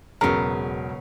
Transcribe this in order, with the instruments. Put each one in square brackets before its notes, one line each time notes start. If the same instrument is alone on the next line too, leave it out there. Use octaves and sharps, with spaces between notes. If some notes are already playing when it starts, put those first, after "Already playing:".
[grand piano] E1 F#3 A#4 [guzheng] C#3 B3